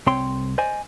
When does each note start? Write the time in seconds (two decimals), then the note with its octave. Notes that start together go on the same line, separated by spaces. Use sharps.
0.07 C2 C4 C#5 G5 C6
0.58 C5 D5 D#5 G#5